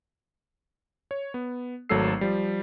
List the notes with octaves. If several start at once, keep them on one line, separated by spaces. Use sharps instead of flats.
C#5
B3
G#1 F#3 A3 A4 E6 C7
F3 G3